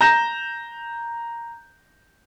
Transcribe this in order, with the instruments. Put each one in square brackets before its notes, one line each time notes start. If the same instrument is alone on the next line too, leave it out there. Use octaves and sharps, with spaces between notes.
[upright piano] A#5 G6 A#6 E7